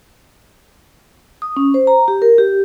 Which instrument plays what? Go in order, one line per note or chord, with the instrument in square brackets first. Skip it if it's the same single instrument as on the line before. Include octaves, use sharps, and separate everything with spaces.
[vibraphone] D#6
C#4
C5
A#5
G4
A#4
G4